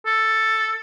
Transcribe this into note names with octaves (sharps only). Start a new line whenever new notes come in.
A4